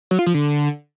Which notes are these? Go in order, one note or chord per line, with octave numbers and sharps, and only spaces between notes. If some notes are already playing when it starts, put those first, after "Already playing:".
F#3
F4
F3
D3